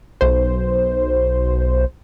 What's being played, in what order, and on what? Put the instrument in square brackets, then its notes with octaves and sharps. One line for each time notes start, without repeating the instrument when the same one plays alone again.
[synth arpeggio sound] B1 C5